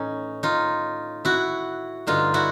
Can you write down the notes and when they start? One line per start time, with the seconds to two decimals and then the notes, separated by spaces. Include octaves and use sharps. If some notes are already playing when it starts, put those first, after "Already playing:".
Already playing: A2 E3 C#4 D#4
0.43 D#4 F4
1.25 E4 F#4
2.07 G2 D3 D#4 F4
2.34 E4 F#4